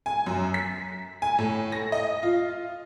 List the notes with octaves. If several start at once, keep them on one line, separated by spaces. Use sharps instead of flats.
G#5
F#2
B6
G#5
A2
A#6
D#5
F4